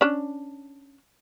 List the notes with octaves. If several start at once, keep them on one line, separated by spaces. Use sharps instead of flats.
C#4 D4